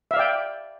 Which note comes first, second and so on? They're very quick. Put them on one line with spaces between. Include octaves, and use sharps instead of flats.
E5 F5 D5 G5